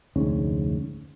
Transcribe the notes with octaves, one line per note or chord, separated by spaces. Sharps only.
F1 D2 G#2 C#4